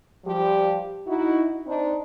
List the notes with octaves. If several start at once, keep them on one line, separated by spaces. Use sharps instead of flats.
F3 G3 G4
D#4 E4 F#4
C4 D4 D#4